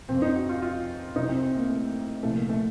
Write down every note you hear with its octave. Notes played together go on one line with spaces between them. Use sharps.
F2 C#3 F3 C4
D#4
F#4
F4
F4
C2 C3 F#3 D#4
C4
C4
A#3
A3
C2 A#2 F3 A3
A#3
A3